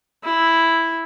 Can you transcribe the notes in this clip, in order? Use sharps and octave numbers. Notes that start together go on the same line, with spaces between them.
E4